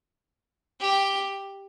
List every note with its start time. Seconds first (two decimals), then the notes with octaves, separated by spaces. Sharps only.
0.81 G4